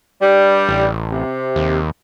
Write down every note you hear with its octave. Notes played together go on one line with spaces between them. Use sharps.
G2 G3
A1
C3
D#2